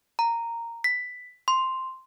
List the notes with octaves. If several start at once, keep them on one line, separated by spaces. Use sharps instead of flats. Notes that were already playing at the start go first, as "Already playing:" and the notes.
A#5
B6
C6